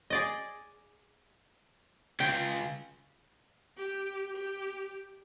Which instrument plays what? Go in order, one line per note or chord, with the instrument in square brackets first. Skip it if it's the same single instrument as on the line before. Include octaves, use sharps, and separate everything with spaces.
[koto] G#4 D5 D#5
[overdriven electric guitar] C#2 C#3 [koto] G5
[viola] G4
G4